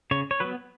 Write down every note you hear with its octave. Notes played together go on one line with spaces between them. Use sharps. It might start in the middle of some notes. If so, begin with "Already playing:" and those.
C#3 C#5
C#5
F#3 B3 B4